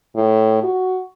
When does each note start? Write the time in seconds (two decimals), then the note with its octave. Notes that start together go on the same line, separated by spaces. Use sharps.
0.16 A2
0.63 F#4